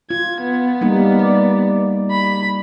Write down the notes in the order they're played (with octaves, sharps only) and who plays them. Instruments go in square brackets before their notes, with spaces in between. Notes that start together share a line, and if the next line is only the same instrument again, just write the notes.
[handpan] F4 [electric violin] G#6
[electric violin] B3
[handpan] G3 A#3 D#4
D5
[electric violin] B5